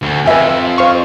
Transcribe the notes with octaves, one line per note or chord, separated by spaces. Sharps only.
D2
F2 B4 E5 G#5
C5 F5 C#6